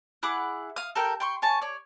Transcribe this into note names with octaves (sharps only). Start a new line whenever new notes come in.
E4 G#4 F#5 D6
F5 D#6
A4 A#4 G5
G5 C6 C#6
C#5 G#5 A5 C#6
C#5 D5